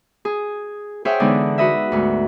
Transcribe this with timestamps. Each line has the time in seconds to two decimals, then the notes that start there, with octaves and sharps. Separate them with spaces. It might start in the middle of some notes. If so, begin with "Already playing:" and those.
0.25 G#4
1.05 G#4 C5 C#5 E5 F#5 G5
1.20 D3 E3 G#3 B3 D4 D#4
1.58 F#4 B4 D#5 E5
1.92 D2 G#2